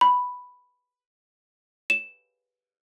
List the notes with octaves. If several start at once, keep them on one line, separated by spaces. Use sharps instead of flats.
B5
E7